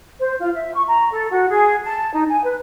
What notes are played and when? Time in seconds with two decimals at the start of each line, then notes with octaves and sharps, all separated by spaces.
0.20 C5
0.40 F4
0.55 E5
0.74 C#6
0.87 A#5
1.12 A4
1.31 F#4
1.49 G#4
1.83 A5
2.14 D#4
2.29 G#5
2.43 B4